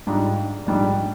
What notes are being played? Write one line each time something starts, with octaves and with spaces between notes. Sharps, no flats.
G#2 G3 D4 F4
A#1 G#2 G3 D4